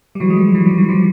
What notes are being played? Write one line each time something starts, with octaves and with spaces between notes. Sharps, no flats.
G3
E3 F#3
G#3
F3 G3
E3 F#3
F3 G3
E3 F#3
F3 G3